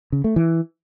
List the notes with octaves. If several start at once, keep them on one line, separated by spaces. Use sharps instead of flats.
C#3
A3
E3